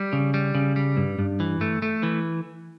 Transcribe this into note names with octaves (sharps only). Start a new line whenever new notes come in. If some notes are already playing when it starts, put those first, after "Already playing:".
Already playing: G3
C#3
G3
C#3
G3
G2
G2
E3
A3
A3
E3